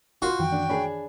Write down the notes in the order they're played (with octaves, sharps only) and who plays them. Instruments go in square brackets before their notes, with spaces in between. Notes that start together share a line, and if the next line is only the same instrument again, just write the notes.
[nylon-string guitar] F4 C5 [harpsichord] F#4
[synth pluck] F#2 D#3 E3 [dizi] G5
[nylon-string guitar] D4
[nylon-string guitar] D4 G#4 [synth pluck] C#5 B5